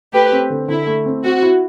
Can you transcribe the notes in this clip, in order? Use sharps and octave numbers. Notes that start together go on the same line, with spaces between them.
A3 G4 B4
C4
D3
D3 E4
A3
C4
C4 F#4
E4